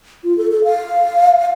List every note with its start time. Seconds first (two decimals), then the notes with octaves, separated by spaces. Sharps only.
0.24 F4
0.37 A4
0.51 A4
0.64 F5